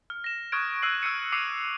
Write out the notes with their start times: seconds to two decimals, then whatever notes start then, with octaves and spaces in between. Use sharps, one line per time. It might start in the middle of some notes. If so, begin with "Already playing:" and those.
0.10 F6
0.24 A#6 E7
0.52 C#6 D#6 F6 F#6 G#6 D7
0.82 C#6 E6 F#6 C7 D#7 F#7
1.02 E6 F#6 G#6 C7 C#7 D#7
1.32 D6 E6 C7 C#7 D#7 F7